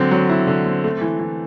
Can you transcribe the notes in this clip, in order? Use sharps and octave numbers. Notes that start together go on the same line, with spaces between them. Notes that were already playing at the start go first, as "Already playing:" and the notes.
Already playing: D3 F#3 C4
F#3
E4
D3
C4
A3
E3
E3